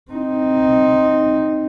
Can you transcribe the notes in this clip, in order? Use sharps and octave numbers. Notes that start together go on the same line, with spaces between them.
C4 D#4